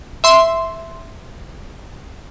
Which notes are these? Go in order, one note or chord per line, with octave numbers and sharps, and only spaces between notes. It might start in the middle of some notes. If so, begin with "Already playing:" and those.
E5 C6